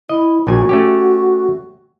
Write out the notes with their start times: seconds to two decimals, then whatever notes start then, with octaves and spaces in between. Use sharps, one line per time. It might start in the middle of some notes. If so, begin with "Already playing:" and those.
0.09 E4 D#5
0.47 A#1 A#2 F#4 G#5
0.69 A3 C#4 G4